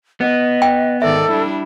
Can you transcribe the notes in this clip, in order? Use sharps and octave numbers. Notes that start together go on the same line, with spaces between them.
B3 D#5
G5
G#2 D#3 A4 D5 E5
G3 D4 E4